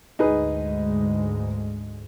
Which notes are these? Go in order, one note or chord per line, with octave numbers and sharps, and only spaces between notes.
D2 G#2 G#3 D#4 G#4 B4